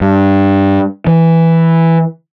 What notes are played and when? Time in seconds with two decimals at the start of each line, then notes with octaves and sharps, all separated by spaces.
0.01 G2
1.07 E3